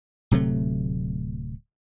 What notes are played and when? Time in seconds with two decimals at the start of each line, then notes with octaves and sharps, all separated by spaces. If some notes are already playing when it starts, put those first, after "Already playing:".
0.31 D1 C3 F#3 A3